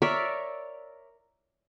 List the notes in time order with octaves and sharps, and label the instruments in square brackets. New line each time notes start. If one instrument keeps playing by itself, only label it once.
[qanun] A#4 C#5 D5 E5